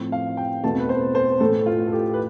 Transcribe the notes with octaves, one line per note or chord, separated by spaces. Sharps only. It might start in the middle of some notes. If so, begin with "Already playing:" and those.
Already playing: A2 F3 C4
F5
G5
E2 B2 A3 C4 A5
B4
C5
C5
A2 E3 A3 A4
F4
A4
G4
B4